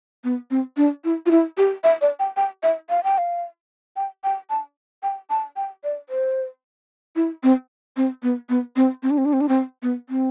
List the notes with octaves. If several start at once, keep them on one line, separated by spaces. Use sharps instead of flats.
B3
C4
D4
E4
F4
E4
G4
E5
D5
G5
G5
E5
F5
G5
F5
G5
G5
A5
G5
A5
G5
D5
C5
E4
C4
C4
B3
B3
C4
C4
D4
C4
D4
C4
D4
C4
B3
C4